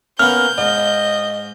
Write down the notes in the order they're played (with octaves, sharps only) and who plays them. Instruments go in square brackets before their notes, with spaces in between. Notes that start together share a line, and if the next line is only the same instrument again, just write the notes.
[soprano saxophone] A#3 [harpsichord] B3 C#4 [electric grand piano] F6 [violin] G6
[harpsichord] G#2 [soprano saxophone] D#5